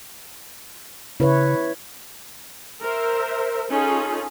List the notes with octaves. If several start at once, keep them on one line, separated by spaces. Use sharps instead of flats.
C#3 E4 B4 C#5
A#4 C5 E5
C#4 D#4 F4 G#4 A4